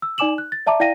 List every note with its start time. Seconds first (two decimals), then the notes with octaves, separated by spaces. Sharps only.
0.02 E6
0.18 D#4 D5 G#5 D6 E7 F#7
0.38 F#6
0.52 A6
0.66 D5 E5 A5 A#5 D6
0.80 E4 D5 F5 G5 A#6 D#7